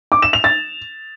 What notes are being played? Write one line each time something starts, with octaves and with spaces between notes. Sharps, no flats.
D6
E7
F7
A6